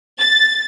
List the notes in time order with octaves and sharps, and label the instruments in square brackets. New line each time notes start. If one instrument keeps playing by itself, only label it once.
[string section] A6